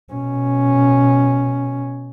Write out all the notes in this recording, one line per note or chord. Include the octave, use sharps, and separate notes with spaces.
B2 C#4